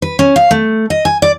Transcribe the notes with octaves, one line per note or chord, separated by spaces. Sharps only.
B4
C#4
F5
A3
D#5
G#5
D5